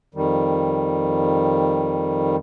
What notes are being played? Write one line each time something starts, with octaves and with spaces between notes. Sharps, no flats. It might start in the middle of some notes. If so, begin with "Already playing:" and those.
F2 D#3 G3